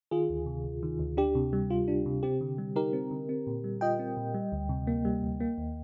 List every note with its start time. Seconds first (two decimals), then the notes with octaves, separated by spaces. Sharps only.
0.11 D#3 F4 G#4
0.30 D2
0.46 C3
0.64 D2
0.83 D#3
0.99 D2
1.17 D4 G4
1.35 C3
1.53 G3
1.70 F4
1.88 D4
2.06 C3
2.23 C4 G4
2.41 D3
2.58 G3
2.76 D#4 G4 A#4
2.93 C4
3.11 D3
3.29 C4
3.47 A#2
3.64 G3
3.81 F4 D#5 G5
3.99 C4
4.17 A#2
4.34 G3
4.52 D2
4.69 C3
4.87 A#3
5.05 G3
5.23 D2
5.40 A#3
5.58 D#2